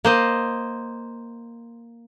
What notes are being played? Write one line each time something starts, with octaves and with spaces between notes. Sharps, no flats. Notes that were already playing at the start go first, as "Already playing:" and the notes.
A#3 C5 D#5